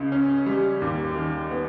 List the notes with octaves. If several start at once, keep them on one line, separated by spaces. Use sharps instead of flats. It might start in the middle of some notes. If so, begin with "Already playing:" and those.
Already playing: C#2 C#3
C#4
G3
D#2
D#3
B3